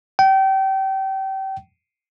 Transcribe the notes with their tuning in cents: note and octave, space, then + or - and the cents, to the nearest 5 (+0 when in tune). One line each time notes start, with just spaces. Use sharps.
G5 -30